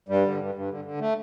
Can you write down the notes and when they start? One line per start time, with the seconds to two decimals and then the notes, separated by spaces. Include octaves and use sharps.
0.09 G2 G3
0.24 D3
0.40 G2
0.55 G2
0.70 D3
0.85 D3
1.00 A3